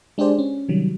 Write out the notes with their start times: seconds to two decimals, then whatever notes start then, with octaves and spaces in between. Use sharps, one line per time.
0.18 G#3 D4 G4 G#4 C5 D5
0.39 C#4
0.69 C3 D#3 F#3 G3